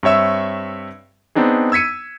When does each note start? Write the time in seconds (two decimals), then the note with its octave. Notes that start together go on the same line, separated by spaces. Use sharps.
0.03 G2 C4 C#5 E5 E6
1.35 B3 C4 D4 D#4 G#4
1.72 E6 G#6 B6 C#7 D#7